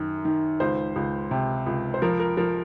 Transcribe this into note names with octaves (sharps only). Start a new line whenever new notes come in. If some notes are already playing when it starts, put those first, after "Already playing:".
Already playing: F#2 D#3
D#3
C#2 C5
C#2
C3
C#2
C5
F3 A#4
A#4
F3 A#4